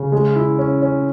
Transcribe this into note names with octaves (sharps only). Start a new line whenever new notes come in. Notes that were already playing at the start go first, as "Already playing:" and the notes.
Already playing: C#3
G#3
E4
C#4
C#4